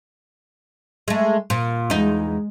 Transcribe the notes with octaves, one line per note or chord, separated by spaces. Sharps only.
G#3 A3
A#2
E2 G#3 D#4